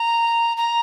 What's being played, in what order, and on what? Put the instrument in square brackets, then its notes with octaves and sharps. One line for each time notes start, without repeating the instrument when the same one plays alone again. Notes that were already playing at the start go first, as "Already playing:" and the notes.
Already playing: [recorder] A#5
A#5